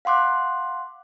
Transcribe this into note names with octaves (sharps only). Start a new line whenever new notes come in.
F5 F#5 C6 D6 F#6